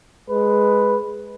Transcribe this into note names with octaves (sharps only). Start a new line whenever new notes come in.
G#3 B4